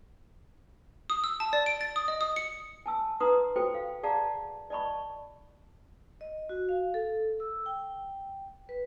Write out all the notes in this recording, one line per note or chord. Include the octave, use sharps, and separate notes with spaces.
D#6
E6
A5
D5
D7
A6
D#6
D#5
D#6
C#7
G#5 A5 E6
D#4 B4 F#5 A#5 C6 D#6
F#4 A4 C5 G5
F5
G#4 D5 F5 F#5 A5 A#5
D5 D#5 A5 B5 C#6
D#5
F#4
F5
A4
E6
G5
B4